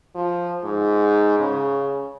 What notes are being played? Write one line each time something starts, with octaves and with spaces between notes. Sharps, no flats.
F3
G#2
C#3